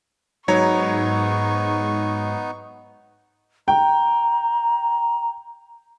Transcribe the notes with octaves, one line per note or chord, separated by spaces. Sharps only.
G#2 F#3 B3 D#4 C#5 A#5 C#6
G5 A#5